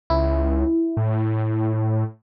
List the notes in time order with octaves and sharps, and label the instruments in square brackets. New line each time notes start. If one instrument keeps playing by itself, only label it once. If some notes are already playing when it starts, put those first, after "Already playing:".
[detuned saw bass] C#2 [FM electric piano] E4
[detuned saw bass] A2